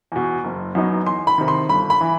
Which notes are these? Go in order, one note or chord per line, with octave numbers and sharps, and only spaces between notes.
E2 B2
F#1
F#2 F#3 B3 D#4
E2 C6
B5
C3 D#3
C6
G1 B5
B5
E3